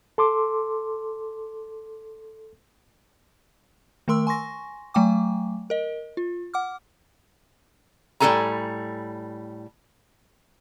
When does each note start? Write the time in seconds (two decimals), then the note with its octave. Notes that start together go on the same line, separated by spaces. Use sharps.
0.18 A4 C6 D6
4.08 D#3 A3 A#4 C6 E6
4.27 G#5 C6 C#6 A#6
4.94 F#3 A3 G5 G#5 D6
5.70 A#4 D#5
6.17 F4
6.54 F#5 D6 F6
8.20 A2 G3 D4 A4 G#5 A#5